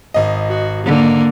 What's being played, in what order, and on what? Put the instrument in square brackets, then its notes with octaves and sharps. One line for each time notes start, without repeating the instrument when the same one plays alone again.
[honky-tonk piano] G#1 D#5
[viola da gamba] F#4
D3 A#3